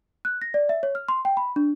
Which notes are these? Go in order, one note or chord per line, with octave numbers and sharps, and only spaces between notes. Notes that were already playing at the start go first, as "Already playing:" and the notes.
F#6
A#6
D5
E5
C#5
F6
C6
G5
B5
D4